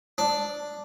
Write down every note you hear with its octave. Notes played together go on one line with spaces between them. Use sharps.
D4